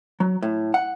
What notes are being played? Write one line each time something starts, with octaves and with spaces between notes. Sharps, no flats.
F#3
A2
F#5